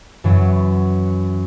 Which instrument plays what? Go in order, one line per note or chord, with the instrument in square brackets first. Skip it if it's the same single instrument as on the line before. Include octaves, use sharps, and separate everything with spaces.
[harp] F#2 E3 F#3